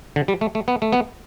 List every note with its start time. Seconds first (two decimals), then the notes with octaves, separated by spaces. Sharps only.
0.16 D3
0.28 G3
0.41 A3
0.55 A3
0.68 B3
0.82 A3
0.93 B3